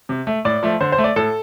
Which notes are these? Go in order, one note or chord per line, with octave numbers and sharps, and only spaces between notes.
C3
A3
A2 D5
F3 A3
D3 C5
C5
A3
D5
A2 A4